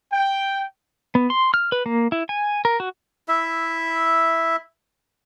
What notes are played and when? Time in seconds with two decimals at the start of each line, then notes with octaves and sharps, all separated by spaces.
0.13 G5
1.15 B3
1.30 C6
1.54 F6
1.72 B4
1.86 A#3
2.12 E4
2.29 G#5
2.65 A#4
2.80 F#4
3.28 E4 E5